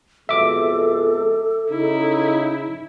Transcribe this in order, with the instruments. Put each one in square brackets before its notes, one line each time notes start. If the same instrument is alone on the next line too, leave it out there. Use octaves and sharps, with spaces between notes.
[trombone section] F2 B2 G#3 [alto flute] A4 [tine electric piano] E5 D6
[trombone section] C#3 D#4 [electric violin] E4